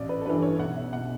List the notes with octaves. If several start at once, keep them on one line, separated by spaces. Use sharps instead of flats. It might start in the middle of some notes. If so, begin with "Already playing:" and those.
Already playing: A1 D5
B4
A4
G2 E3 B4
C#5
B1 F#5
E5
B2 F#5